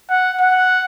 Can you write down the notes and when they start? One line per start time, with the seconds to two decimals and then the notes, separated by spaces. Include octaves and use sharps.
0.10 F#5
0.41 F#5